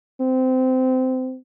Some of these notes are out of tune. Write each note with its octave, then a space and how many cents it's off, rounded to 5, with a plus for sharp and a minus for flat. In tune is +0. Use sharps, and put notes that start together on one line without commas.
C4 -20